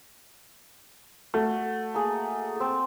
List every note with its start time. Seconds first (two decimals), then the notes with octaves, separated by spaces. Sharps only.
1.34 A3 F#4
1.94 A#3 G#4
2.56 C4 A4